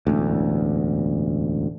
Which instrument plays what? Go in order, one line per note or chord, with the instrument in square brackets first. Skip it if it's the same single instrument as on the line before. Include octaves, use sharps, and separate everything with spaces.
[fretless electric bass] E1 A1 D2